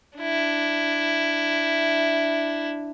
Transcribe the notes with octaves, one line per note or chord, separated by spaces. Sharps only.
D4 E4